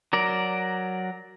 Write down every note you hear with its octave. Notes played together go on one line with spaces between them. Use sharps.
F#3 A#4 D5